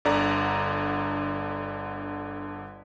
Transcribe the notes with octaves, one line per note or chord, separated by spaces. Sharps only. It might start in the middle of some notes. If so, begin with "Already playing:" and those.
G1 D3 D5 A#5